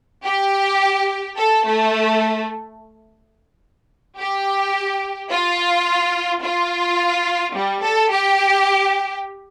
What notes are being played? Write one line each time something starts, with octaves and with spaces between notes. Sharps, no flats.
G4
A4
A3
G4
F4
F4
G3
A4
G4